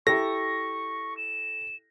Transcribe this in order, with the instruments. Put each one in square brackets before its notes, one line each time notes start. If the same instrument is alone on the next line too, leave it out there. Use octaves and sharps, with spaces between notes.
[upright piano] E4 G4 A4 [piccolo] C#6 [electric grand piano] A#6
[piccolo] E7